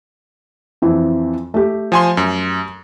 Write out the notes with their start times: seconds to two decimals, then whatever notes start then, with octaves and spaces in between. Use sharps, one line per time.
0.82 F2 E3 C4
1.54 A3 G4
1.92 F3 G#5 C6
2.17 F#2